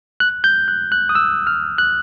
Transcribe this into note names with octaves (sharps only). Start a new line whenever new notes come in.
F#6
G6
F#6
F#6
D#6
E6
F6
F#6